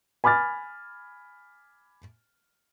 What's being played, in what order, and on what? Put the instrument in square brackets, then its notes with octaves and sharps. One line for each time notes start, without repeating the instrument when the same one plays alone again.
[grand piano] G#5 B5 D6 F6 A6